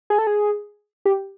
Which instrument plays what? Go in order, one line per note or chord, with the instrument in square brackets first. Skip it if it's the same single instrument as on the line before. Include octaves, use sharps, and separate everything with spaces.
[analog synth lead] G#4
A4
G#4
G4